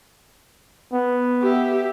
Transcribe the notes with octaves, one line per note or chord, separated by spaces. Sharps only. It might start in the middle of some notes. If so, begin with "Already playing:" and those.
B3
G4 E5